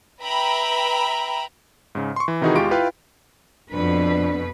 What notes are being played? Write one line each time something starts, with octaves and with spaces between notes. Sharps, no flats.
B4 E5 G5 A#5 B5
G#2 C#3
C6 C#6
E3
C3 D#3 E3 D#4 F#4 G#4
E2 G#3 F4 G4 C#6 D7
E4 F4 B4 F5 G5
F2 B2 D4 B4